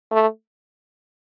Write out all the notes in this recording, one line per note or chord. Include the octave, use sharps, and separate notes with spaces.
A3